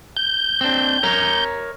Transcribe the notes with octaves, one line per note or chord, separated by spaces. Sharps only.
G6
C4 D4
A#4 C#5 A#5